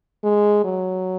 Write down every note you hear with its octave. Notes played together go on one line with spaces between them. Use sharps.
G#3
F#3